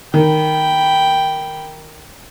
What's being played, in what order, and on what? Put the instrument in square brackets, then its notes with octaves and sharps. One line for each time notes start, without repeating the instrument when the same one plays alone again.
[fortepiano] D#3 [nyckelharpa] G5 B5